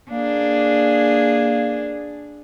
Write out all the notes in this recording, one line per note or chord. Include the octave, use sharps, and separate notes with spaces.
A#3 D4 G#4